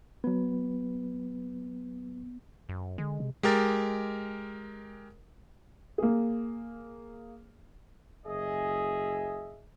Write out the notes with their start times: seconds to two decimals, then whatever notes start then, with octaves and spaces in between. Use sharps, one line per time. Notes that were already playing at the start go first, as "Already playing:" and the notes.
0.24 F#3 B3 B4
2.69 F#2
2.98 D3 G#3
3.20 C3
3.43 G#3 G4 A#4 A6
5.98 A#3 G#4
8.26 F#1 G#4 D#5 E5